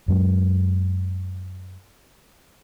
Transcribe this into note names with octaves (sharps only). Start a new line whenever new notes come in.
F#2 F#3 G#3